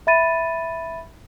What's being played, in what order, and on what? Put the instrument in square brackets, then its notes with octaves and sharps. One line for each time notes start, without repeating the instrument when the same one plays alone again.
[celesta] E5 B5 A6 D#7